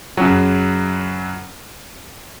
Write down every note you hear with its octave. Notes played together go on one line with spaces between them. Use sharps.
F#2 C#3 F#3